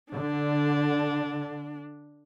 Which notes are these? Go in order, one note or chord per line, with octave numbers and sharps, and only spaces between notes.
D3 D4